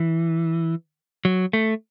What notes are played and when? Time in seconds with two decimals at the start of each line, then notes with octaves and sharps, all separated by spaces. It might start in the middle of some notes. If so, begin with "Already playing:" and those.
Already playing: E3
1.25 F#3
1.53 A3